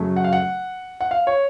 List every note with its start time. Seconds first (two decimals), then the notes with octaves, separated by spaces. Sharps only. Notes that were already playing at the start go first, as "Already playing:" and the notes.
Already playing: F#2 C#3 F#3 A3
0.16 F#5
0.24 F5
0.33 F#5
1.01 F#5
1.11 F5
1.27 C#5